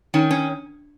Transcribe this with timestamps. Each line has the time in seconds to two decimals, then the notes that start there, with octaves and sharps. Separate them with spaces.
0.14 D#3 C#4
0.31 C#4